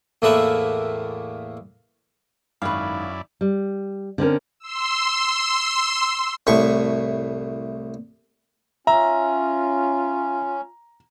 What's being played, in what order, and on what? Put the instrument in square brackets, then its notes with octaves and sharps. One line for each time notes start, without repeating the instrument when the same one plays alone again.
[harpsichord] E2 A2 A3 A#3 B4 E5
[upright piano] G#1 D#3 [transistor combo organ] F#2 E4 D5 [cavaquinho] B4 C#5 F5
[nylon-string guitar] G3
D3 C4 C#4 A#4
[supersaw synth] C6 E6
[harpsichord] C2 A2 C#6
[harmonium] C#4 [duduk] F4 [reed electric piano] E5 [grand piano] A#5